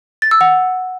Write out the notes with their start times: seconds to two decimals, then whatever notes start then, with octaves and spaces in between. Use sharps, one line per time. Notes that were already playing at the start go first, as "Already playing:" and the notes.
0.22 A6
0.31 E6
0.41 F#5